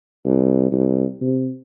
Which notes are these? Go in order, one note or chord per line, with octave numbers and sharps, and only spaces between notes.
C2
C2
C3